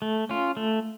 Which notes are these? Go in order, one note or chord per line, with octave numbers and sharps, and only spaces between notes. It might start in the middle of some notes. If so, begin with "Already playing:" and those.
A3
C#4 F4
A3